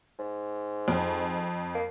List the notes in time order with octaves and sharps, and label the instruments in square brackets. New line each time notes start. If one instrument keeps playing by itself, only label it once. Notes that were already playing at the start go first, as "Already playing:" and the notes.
[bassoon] G#2
[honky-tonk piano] F2
[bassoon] A#3